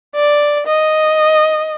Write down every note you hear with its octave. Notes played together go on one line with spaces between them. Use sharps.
D5
D#5